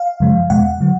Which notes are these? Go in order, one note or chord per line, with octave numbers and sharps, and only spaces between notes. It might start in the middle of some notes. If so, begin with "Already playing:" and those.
Already playing: F5
F#2 C#3 F3 G#3
E2 B2 G#3 F#5
D3 F#3